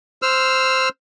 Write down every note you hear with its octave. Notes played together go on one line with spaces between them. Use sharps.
C5 E6 F6